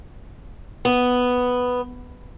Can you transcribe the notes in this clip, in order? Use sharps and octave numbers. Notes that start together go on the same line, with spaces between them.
B3